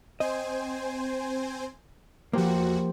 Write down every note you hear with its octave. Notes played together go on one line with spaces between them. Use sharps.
C4 C5 D#5 G#5
E2 F3 A#3 F#4 G4 C5